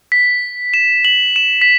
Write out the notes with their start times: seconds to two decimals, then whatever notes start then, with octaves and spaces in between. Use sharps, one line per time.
0.12 B6
0.74 E7
1.05 F#7
1.36 E7
1.61 B6